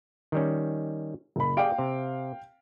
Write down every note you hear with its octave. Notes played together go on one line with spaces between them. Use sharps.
D#3 G3 C#4
F#1 B5
G4 G#4 D5 F5 G5 D7
C3